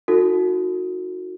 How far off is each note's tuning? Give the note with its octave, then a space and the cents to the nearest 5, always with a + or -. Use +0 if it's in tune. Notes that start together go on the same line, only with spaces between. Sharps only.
D#4 +20 F#4 -25 A4 +40